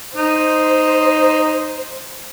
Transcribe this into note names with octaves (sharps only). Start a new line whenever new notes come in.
D#4 C5